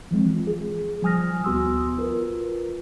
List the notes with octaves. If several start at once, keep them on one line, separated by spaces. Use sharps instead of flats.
E3 F3 G#3 C4
F4
G#4
F3 G3 G#5 D#6 F6 A#6
D2 B3 F#4 C6 D#6 E6
F4 A#4 B4